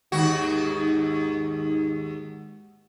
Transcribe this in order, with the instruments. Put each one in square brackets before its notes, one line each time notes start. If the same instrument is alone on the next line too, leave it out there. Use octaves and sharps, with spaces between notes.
[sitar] D#2 F#4 [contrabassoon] G#2